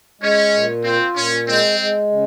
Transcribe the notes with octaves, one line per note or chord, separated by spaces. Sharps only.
G#3 C#4
A#2
C4 F4
A#2 C#4
G#3 C4
G#3
C#3